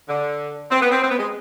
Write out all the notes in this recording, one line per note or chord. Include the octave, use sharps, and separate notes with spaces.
D3
C4
B3
C4
C4
B3
G#3